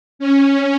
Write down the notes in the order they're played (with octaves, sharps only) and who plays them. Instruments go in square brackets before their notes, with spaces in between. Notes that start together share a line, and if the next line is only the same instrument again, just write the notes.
[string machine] C#4